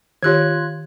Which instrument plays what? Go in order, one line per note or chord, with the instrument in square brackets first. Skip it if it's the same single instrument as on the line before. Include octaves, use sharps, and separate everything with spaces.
[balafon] D#3 G4 C#5 [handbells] F4 F#6 G#6